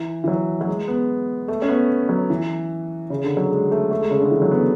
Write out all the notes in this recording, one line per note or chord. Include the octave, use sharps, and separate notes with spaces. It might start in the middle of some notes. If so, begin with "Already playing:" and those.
Already playing: E3
E3
F#3
F#3
G#3
B3
A3
C#4
B3
F#3
E3
C#3
D3
F#3
G#3
A3
A3
G#3
C#3
D3
E3
F#3
B3